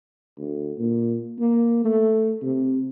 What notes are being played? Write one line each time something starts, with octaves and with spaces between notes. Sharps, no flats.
D2
A#2
A#3
A3
C3